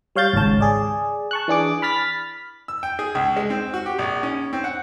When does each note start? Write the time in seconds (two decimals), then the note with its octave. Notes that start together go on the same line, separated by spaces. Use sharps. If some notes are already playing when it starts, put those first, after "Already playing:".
0.16 G3 C#5 F5 G6 A6
0.33 G#1 C#2 G#2 C#5 A5
0.61 G#4 D5
1.31 A5 C#6 F#6
1.48 E3 D4 G#4 D6
1.82 B5 F6 A6 B6
2.68 E6
2.83 G5
2.99 G#4
3.15 C#2
3.36 G#3
3.50 C4
3.74 F#4
3.86 G4
3.99 A#1
4.23 C#4
4.53 C4
4.64 F#5